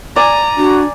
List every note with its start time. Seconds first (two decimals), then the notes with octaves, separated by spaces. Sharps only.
0.16 D5 G#5 A#5
0.57 D4 F#4